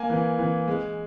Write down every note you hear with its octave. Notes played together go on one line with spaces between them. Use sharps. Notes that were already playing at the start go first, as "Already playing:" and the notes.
Already playing: A#3 G#5
E3
E3
G#3